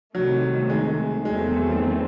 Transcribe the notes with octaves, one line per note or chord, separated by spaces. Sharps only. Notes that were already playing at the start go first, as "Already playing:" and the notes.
C2 C3 D#3 F#3 A3
G#3
E2 D#3 F#3 G#3 A3 C4